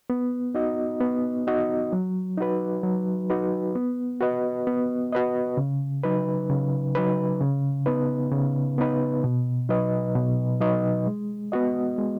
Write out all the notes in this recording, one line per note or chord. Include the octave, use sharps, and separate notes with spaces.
B3
D#4 F#4 D#5
B3
D#4 F#4 D#5
F#3
D#4 F#4 B4
F#3
D#4 F#4 B4
B3
F#4 B4 D#5
B3
F#4 B4 D#5
C#3
F#3 D#4 B4
C#3
F#3 D#4 B4
C#3
B3 D#4 B4
C#3
B3 D#4 B4
B2
F#3 D#4 B4 D#5
B2
F#3 D#4 B4 D#5
G#3
B3 F#4 D#5
G#3